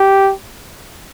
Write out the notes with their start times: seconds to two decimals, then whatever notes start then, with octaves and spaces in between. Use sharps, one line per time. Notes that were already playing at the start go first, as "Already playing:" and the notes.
Already playing: G4